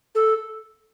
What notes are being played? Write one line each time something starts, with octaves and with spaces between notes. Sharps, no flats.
A4